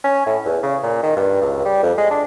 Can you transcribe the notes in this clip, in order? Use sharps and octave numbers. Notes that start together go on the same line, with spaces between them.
C#4
A2
E2
C#3
A#2
D#3
G2
C#2
G3
F2
G#3
D4